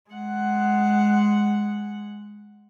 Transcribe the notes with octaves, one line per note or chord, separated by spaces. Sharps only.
G#3 F#5